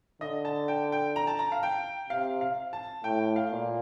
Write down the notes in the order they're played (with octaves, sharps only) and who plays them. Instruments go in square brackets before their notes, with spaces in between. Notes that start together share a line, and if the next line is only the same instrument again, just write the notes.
[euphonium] D3 [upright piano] D#5
[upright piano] A5
G5
G5
A#5
A5
A#5
F5
G5
[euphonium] C3 [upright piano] F5
[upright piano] F5
A5
[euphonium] A2 [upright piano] G5
[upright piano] F5
[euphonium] A#2